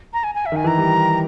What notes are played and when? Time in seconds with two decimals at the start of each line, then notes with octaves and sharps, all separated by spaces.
0.13 A#5
0.24 G#5
0.35 G#5
0.46 E5
0.52 D#3 G#5
0.64 E3 A#5
0.77 G3